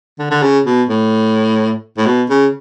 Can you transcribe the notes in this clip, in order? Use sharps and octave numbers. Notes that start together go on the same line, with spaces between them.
D3
D3
C#3
B2
A2
A2
B2
C#3